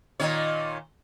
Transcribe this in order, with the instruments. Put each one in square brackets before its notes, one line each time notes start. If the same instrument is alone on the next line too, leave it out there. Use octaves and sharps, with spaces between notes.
[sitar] A#2 D#3 C#5